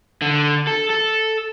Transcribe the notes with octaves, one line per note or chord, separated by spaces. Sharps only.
D3
A4
A4